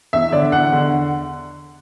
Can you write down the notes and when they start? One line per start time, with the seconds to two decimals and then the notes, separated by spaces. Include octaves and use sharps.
0.13 E2 E5
0.32 D3 D5
0.52 E2 F#5
0.73 D3